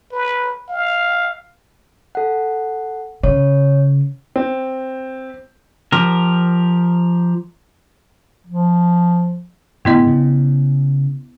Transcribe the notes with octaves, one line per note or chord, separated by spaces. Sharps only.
B4
F5
A4 F#5
C#3 C#5
C4
F3 G4 A#4
F3
A2 D3 G#3 B3 E4 D#5
C#3